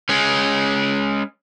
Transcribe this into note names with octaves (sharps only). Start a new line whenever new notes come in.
G#3 C#4